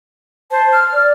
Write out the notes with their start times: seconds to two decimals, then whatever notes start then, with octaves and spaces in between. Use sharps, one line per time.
0.51 C5 A5
0.72 F6
0.93 D5